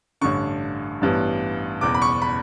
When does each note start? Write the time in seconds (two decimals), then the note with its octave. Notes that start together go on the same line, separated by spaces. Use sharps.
0.21 A1 G2 D3 C#6
1.01 A1 G2 E3 G3 B3
1.81 F#1 E2 B2 D6
1.94 B5
2.02 C#6
2.22 B5